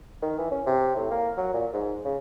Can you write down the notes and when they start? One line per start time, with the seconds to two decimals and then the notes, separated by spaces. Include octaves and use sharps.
0.22 D#3
0.38 E3
0.51 C#4
0.66 C3
0.96 A2
1.10 A#3
1.37 F#3
1.54 A#2
1.73 G#2
2.05 C#3